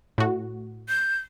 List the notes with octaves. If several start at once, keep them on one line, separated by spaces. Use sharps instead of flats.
A2 F#4
G6